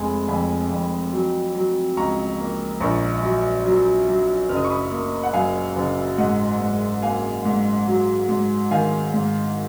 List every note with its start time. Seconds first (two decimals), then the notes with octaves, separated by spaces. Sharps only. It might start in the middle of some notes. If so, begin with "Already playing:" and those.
Already playing: F1 G#3 G#5 B5
0.28 F2 G#5 B5
0.71 F2
1.13 F#3
1.55 F#3
1.97 C#2 A#5 C#6
2.40 A#3
2.80 A#1 A#5 C#6
3.23 F#3
3.66 F#3
4.07 F#3
4.49 F#1 F6
4.56 D#6
4.64 C#6
4.70 B5 D#6
4.92 A#3
5.23 F#5
5.33 F#2 F5 G#5
5.76 F#1
6.18 G#2 D#5 F#5
6.61 G#2
7.02 A#3 F5 G#5
7.45 G#2
7.87 F#3
8.29 G#2
8.71 D#3 F5 G#5
9.13 G#2